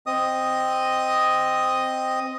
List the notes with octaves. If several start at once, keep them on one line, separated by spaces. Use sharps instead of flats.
C4 D#5 D#6